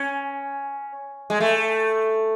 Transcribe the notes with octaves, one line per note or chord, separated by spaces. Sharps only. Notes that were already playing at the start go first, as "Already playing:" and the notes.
Already playing: C#4
G#3
A3